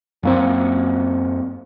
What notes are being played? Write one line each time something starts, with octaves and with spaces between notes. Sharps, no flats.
F#2 A#3 C4